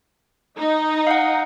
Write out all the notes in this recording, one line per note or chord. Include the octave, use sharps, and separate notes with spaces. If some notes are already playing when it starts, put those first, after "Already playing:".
D#4
F5 F#5